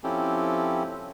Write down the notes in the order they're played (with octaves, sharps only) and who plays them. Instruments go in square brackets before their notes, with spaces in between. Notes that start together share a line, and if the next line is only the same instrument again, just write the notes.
[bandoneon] F3 C4 C#4 E4 G4 A4